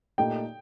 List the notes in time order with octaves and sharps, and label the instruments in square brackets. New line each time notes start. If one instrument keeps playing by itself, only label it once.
[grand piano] A#2 A3 D#4 G4 [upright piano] G5